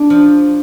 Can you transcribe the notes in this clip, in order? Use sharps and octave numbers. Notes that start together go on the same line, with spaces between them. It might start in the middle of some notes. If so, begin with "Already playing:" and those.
Already playing: D4
F3